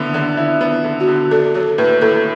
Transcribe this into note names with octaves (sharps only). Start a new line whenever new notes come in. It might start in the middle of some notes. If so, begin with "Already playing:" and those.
Already playing: D3 B3 E4
D3
E4
B3
D3
F#4
D3
D4 A4
F#3 A4
A2 B4
A2 A4